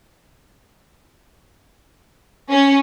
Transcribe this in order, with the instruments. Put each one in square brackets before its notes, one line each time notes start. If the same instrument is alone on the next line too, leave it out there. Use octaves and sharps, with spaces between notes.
[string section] C#4